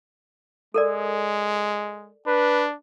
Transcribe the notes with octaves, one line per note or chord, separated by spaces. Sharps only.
G#3 A4 A#4 D5
D4 B4